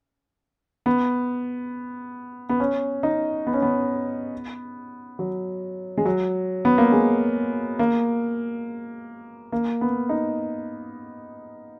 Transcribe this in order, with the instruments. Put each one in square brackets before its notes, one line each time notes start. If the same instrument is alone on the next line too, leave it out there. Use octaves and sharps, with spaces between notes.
[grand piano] B3
B3
C#4
D#4
B3
C#4
B3
F#3
G#3
F#3
B3
A#3
G#3
A#3
A#3
B3
D#4